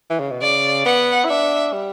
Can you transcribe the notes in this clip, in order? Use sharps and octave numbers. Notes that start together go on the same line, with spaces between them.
E3
C#3
B2
C#3 D5
B3 F#5
E4
D4 E5
G3